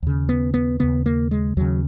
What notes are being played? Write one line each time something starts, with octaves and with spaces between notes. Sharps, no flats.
D#2 C#3
B3
B3
D#2 C#3 B3
A#3
G#3
D#2 C#3 F#3